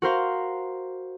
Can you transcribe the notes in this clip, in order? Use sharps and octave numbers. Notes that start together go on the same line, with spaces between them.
F#4 A#4 C5 F5